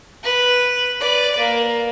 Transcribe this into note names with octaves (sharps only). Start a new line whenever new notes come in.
B4
B4 D5
A#3